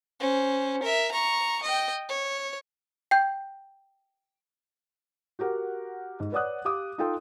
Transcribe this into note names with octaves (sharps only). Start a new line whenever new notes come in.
C#4 C5
A#4 E5
A#5 C#6
D#5 G5
C#5
G5 G6
F#4 G4 A#4 F#5
G#2
B4 C#5 D5 F#5 D#6 F#6
G4 F5 D6 D#6
D#4 F4 A4 F5 G5 C6